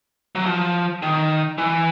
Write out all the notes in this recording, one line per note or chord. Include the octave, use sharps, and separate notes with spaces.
F#3
F3
D#3
E3